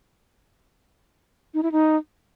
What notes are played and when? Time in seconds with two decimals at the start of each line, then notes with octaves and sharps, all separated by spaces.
1.54 D#4
1.63 E4
1.72 D#4